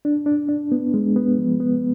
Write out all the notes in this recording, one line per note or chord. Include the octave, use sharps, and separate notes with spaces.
D4
D4
D4
B3
G#3
B3
F3
B3